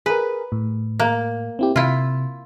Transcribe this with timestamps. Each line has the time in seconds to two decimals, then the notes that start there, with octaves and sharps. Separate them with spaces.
0.06 G#4 A#4 B4
0.52 A2
1.00 A#3
1.59 C4 E4 G4
1.76 C3 E4 F4